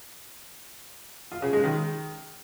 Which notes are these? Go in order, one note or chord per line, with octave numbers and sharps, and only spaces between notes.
F4
C#3
G#3
D#3